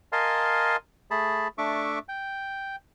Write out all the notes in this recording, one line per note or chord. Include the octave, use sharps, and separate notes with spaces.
A#4 D#5 F5 G#5 A5 C6
A3 G#4 A5 B5
A3 D4 E5 C#6 D6
G5